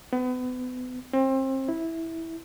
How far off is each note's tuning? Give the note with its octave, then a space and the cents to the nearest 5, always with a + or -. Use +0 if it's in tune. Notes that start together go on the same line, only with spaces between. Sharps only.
B3 +35
C4 +30
E4 -10